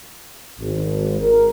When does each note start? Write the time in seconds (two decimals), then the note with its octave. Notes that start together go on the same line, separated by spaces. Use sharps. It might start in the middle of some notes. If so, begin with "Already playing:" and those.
0.59 G#1
1.19 A#4